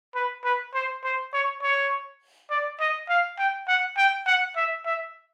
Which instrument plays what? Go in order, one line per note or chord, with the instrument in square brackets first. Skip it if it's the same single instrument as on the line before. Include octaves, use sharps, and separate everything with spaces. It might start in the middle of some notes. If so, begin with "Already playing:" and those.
[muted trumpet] B4
B4
C5
C5
C#5
C#5
D5
D#5
F5
G5
F#5
G5
F#5
E5
E5